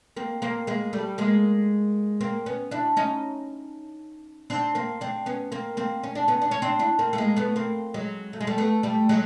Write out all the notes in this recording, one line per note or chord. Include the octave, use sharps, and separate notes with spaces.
A#3 C4
A#3 C4
G#3 A#3
G3 A3
G#3 A#3
A#3 C4
B3 C#4
D4 E4
C#4 D#4
C4 D4
A#3 C4
C4 D4
B3 C#4
A#3 C4
A#3 C4
C#4
D4
B3 C#4
D4
C#4
C4 D4
D4 E4
A#3 C4
A3
G#3 A#3
A3 B3
A#3 C4
F#3 G#3
A3
G#3
G3 A3
A3 B3
G3 A3
F#3 G#3